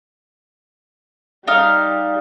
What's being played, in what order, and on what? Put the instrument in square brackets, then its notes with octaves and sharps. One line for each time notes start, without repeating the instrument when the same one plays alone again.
[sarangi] G3 [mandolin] D#4 F5 F6